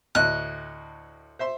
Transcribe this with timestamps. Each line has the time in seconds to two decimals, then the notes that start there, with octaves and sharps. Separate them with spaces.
0.15 D2 A2 D#5 F#6
1.39 C5 E5 C6